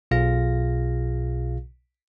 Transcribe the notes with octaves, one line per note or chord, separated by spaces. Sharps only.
B1 B2 F4 G#4 F5 A#6